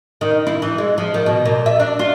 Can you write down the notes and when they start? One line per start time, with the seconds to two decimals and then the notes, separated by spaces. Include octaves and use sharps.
0.21 D#3
0.47 E4
0.62 E3
0.78 G#3
0.98 F3
1.14 D#3
1.26 B2
1.45 A#2
1.66 E5
1.80 D4
1.99 F4